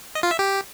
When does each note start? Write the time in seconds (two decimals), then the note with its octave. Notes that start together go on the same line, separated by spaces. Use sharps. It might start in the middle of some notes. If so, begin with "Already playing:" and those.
0.15 D#5
0.23 F4
0.31 E5
0.39 G4